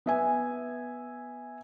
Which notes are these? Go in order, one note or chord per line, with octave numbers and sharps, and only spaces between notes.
B3 E5 G#5